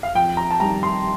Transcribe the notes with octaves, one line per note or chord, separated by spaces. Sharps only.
F5
F2 G5
A#5
A5
D#3 G3 A#5
C6